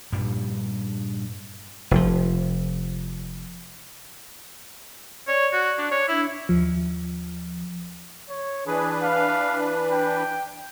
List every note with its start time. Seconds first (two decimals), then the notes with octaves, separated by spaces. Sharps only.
0.12 G2 A#2 G3
1.91 F1 F3
5.28 C#5 D5 C#6
5.53 F#4
5.79 D4
5.92 C#5
6.08 D4 E4 E5
6.49 D#2 F3
8.30 C#5
8.67 E3 D4 G#4 B4
9.03 F5
9.92 G5